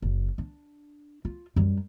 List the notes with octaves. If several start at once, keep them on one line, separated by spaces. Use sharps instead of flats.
F#1
D4
F4
F#2 G3